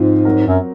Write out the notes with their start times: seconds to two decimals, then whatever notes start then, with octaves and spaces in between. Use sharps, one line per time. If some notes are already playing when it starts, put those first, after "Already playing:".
Already playing: G#2 F3 C4 F4
0.25 F#3 C4 F#4 A#4
0.47 F#2